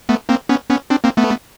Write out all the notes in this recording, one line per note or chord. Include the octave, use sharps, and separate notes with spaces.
A3 B3
A#3 C4
B3 C#4
B3 C#4
C4 D4
A#3 C4
A3 B3